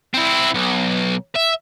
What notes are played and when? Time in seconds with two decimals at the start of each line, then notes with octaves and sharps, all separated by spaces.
0.14 C4 E4
0.55 B1
1.36 E5